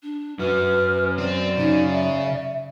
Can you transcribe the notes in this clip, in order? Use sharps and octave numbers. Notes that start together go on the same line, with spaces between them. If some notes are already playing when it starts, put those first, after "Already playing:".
D4
F#2 F#3 B4 F6
C4 D5
C#3 D#4
E5